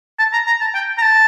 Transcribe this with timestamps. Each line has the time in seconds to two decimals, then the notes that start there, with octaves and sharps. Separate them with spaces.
0.19 A5
0.33 A#5
0.46 A#5
0.61 A5
0.75 G5
0.98 A#5
1.02 A5